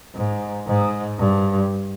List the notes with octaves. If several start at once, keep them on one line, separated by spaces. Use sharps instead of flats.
G#2
G#2
G2